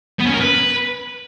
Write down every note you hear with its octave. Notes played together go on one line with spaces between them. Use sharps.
B3
C#4
A#4
B4